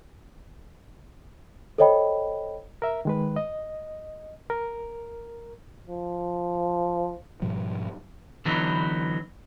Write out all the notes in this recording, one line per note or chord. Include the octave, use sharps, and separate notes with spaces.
A4 C5 C#5 D#5 G5 B5
A#4 E5
D#3 G#3 B4
D#5
A#4
F3
G#2 B2 F3 G3
D3 E3 F#3 B3 D#4